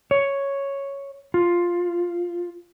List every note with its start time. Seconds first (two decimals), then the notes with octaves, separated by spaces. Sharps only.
0.11 C#5
1.34 F4